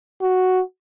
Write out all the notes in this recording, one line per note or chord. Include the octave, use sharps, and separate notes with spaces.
F#4